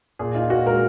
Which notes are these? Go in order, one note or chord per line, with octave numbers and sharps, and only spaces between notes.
A#2 G#4
D#4 F4
A#2 F#4
G#3 A#4